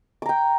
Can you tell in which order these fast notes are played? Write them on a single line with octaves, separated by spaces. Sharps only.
D6 A#5 G5